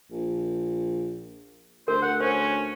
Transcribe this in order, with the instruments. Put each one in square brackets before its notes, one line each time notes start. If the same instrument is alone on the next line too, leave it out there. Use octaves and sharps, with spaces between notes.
[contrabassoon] A#1
[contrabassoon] D2 [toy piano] A#4 [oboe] C5
[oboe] F#5
[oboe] C#4 [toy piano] C5